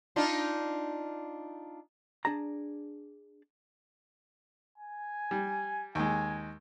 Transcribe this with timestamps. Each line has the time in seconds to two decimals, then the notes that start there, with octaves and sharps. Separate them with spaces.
0.16 D4 D#4 F4
2.25 D4 G#4 D5 A5 A#5
4.78 G#5
5.31 G3
5.95 D#2 G#3 G#5